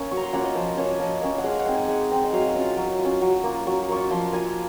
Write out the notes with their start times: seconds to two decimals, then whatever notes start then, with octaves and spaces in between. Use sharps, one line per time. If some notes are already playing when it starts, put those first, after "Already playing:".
Already playing: A#3 C#4
0.11 F#3 C#6
0.17 A#5
0.23 C6
0.33 A#3 C#4 F4 F#5
0.44 D#5
0.55 F3 C5
0.77 A#3 C#4 C#5
0.99 F3 D#5
1.22 A#3 C#4 D#5
1.38 F#5
1.44 G#3 F5
1.60 F#5
1.66 C4 D#4
1.74 G#5
1.88 G#3 F#5
2.11 C4 D#4
2.24 D#5
2.33 F#3 F5
2.55 C#4 F4 D#5
2.77 F#3
2.99 F4
3.05 C#4
3.21 F#3
3.44 A#3 F4
3.67 F#3 C#6
3.89 A#3 F4 C#6
4.10 F3 C6
4.26 A#5
4.33 A#3 F4 G#5